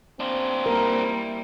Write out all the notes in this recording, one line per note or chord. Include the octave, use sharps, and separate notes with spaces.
C4 D4 F4
G3 A#3 E4 A#4